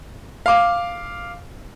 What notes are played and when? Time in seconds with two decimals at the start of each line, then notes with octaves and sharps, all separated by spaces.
0.46 F5 D6